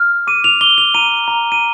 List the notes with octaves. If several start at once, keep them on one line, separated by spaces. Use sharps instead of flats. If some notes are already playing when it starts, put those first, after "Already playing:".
Already playing: F6
D6 D#7
F7
D6 G7
F7
A#5 D#7
A#5
D#7